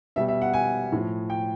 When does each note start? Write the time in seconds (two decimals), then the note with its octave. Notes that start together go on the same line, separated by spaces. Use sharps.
0.16 B2 G3 E5
0.28 E5
0.42 F#5
0.54 G#5
0.92 A2 F3
1.30 G5